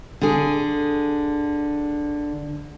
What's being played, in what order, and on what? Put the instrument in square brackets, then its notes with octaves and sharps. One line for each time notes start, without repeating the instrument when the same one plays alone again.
[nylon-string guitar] D3 G#4